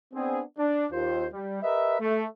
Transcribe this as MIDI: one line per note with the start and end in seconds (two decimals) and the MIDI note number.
0.14 0.42 59
0.14 0.42 60
0.14 0.42 62
0.14 0.42 68
0.58 0.85 62
0.92 1.26 39
0.92 1.26 65
0.92 1.26 72
1.33 1.62 55
1.62 1.98 67
1.62 1.98 70
1.62 1.98 71
1.62 1.98 75
1.62 1.98 76
2.01 2.26 57